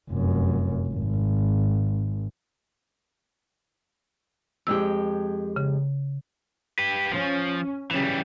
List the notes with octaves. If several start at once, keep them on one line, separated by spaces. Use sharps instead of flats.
F1 F#2
G#1
F2 G#3 G4 E6
C#3
G4 B4
F3 C#4
C#3 E3 F#3 G3